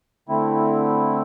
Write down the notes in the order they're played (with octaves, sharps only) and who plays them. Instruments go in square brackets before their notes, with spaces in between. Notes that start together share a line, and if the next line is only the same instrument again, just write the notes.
[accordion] D3 A3 C4 E4